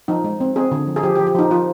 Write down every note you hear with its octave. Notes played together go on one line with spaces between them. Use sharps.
F3 D#4
G#3
C4
C4 G#4
D3
F3
G#4
F3 G4
G4
F3
G4
F3 D#4
F3 F4